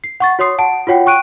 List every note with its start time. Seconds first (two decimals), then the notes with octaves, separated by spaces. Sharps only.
0.04 C7
0.20 F#5 C#6 A6
0.39 F#4 C#5 C6 D#6 C7
0.58 F#5 A5 D7
0.87 F4 F#4 C#5 F#5 G5
1.06 G5 C#6 F#6 D7 D#7